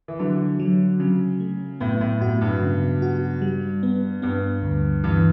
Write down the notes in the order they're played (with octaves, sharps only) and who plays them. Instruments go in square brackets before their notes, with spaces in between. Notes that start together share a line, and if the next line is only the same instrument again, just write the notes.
[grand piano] E3
[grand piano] D3 [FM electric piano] F#3
[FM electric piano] F#3
[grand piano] C#3 [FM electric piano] F#3
[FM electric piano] A3
[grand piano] A2 [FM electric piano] B3
[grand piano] A2
[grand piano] A2 [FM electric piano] F#4
[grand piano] G2
[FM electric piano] C#3
F#4
G3
B3
[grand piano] G2 [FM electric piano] B3
[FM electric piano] D2
[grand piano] G2 [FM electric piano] E3